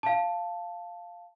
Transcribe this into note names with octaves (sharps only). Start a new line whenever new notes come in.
F5 A5